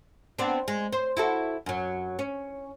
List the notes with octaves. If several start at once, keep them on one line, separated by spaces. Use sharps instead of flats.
B3 C4 D4
G#3
C5
E4 F#4 A4
F#2 F#3
C#4